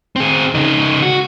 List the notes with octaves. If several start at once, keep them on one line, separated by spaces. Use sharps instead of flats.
C4 G#4
C#3 D#4
F#4